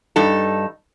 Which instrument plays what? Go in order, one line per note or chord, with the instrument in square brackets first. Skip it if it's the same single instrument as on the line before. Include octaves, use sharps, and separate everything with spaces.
[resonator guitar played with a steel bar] G2 D#4 A4